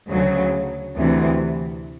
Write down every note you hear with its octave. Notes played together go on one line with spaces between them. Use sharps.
D2 C#3 F#3
D2 C3 E3